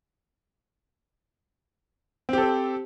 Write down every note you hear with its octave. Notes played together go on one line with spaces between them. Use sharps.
C4 G4 A4 C5